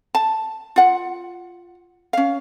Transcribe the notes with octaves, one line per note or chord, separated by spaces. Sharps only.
A5
F4 F#5
C#4 F5